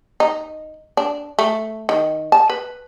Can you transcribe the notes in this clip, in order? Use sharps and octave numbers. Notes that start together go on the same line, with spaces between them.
D#4
D4
A3
D#3
A5
B4